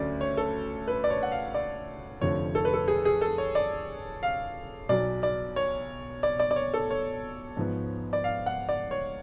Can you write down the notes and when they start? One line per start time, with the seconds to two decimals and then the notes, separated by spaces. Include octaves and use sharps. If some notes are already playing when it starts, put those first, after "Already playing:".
Already playing: D2 D3 F#3 A3 C#4 D5
0.21 C#5
0.37 A4
0.88 B4
1.04 D5
1.10 C#5
1.23 F#5
1.32 F5
1.54 D5
2.21 F1 F2 D3 F3 C#5
2.55 A4
2.65 B4
2.74 A4
2.88 G#4
3.05 G#4
3.21 A4
3.38 C#5
3.55 D5
4.23 F5
4.89 B1 B2 F#3 D5
5.23 D5
5.56 C#5
6.23 D5
6.40 D5
6.51 D5
6.56 C#5
6.74 A4
6.90 C#5
7.57 G#2 F3 B3
8.13 D5
8.24 F5
8.46 F#5
8.69 D5
8.91 C#5